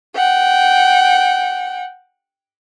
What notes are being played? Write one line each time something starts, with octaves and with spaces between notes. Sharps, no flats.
F#5 G5